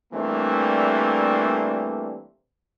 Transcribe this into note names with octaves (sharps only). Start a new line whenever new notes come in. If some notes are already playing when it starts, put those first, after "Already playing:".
E3 G3 A3 A#3 C4 D4